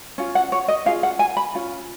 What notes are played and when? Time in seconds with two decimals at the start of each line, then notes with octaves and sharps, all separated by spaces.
0.18 C#4 F4
0.35 F#5
0.52 C#5
0.68 D#5
0.85 C#4 F4 G#4 F5
1.03 F#5
1.19 G#5
1.37 B5
1.55 C#4 F4